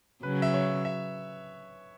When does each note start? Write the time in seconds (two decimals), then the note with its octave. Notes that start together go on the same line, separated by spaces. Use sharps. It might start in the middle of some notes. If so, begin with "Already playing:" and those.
0.23 C#3 F#3 B4
0.42 E5
0.54 C#5
0.85 E5